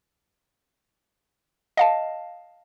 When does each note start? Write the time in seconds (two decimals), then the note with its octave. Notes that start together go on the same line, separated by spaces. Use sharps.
1.77 D#5 F5 A5